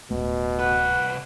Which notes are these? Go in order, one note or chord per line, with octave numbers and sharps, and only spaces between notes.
D1 B2 A3
C2 B4 F#5